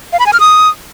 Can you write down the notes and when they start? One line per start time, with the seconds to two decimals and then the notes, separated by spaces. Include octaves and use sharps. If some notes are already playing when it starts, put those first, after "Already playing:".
0.13 F5
0.19 B5
0.26 G#5
0.33 F6
0.40 D#6